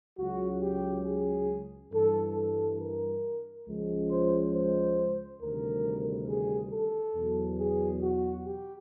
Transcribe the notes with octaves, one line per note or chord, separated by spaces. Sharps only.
C#2 C#3 F#3 F#4
G4
G#4
G2 E3 G3 A4
A4
A#4
C#2 C#3 F3 G#3
C5
C5
D2 C3 D#3 G3 A#4
G#4
A4
E2 B2 F#3
G#4
F#4
G4